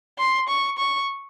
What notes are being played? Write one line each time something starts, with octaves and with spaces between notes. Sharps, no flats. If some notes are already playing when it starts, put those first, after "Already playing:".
C6
C#6
C#6